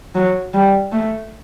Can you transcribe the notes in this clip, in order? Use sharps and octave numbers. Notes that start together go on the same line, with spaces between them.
F#3
G3
A3